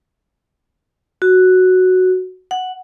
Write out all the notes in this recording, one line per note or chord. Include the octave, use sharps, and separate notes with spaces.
F#4
F#5